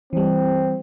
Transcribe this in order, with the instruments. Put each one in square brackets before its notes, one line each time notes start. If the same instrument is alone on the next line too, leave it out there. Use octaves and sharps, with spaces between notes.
[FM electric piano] E3 G3 [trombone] C4